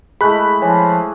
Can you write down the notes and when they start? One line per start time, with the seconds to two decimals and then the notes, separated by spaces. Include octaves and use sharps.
0.21 G#3 A3 E4 G#4 B5 F#6
0.62 E3 F3 C#5 G#5